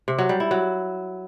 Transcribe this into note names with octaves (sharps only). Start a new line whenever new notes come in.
C3
F#3
G3
E4
F#3